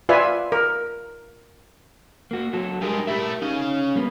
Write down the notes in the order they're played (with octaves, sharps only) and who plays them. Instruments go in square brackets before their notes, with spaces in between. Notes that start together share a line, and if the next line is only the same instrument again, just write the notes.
[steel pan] F4 B4 D5 E5 G#5
A#4
[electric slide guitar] A#3 F#4
F#3 F#4 A4
[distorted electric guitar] G2 G#3 [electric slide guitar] G4 G#4 A#4
[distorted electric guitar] A3 E4 [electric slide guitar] G4 A#4 E5
[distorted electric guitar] C#4 F5 [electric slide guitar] D#4
[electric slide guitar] G3 A#3 B3